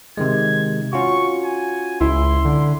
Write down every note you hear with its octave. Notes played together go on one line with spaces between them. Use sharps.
C3 D#3 G#3 G#6
C#4 F4 F#4 C#6
G#5
C#2 E4 C6
D3